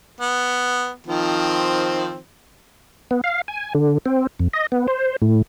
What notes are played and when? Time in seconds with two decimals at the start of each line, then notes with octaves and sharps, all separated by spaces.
0.20 B3
1.07 D#3 F3 C4
3.11 B3
3.24 F5
3.48 G#5
3.75 D3
4.06 C4
4.39 F2
4.53 D#5
4.72 B3
4.88 C5
5.22 A2